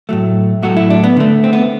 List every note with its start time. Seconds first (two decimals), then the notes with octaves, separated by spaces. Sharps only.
0.09 A2 F#3 A3
0.63 A2 F#3 A3 F#4
0.77 E4
0.90 D4
1.04 B3
1.16 D3 A3
1.44 C4
1.53 B3